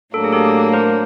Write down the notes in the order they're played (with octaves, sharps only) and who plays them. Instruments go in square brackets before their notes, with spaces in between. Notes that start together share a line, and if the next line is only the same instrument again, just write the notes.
[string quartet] A2 F#3 A#3 D4 [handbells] A4
[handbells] G#4
G4 A4
A#4 C5